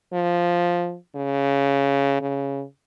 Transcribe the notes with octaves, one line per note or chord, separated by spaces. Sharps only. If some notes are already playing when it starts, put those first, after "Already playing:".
F3
C#3
C#3